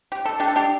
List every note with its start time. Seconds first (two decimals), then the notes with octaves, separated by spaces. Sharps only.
0.12 G4
0.25 A4
0.40 D4 G4
0.48 A4
0.56 D4 G4